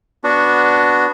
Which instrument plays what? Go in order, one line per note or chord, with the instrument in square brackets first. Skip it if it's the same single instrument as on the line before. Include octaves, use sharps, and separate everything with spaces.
[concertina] B3 D4 F#4